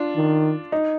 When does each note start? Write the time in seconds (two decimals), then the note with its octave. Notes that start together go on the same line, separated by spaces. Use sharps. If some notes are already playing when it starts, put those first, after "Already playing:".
Already playing: D4 F4
0.15 D#3
0.72 D#4